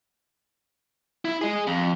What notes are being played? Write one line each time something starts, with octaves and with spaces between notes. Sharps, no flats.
E4
G#4 D#5
F2